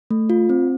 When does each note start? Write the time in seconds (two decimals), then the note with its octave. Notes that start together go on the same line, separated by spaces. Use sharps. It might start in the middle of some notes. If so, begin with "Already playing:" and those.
0.11 A3
0.30 F4
0.49 C4